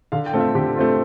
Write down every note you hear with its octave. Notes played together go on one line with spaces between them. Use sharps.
D3 F5
G5
A3 C4 F4 F5
E5
D3 G4
A3 C4 F4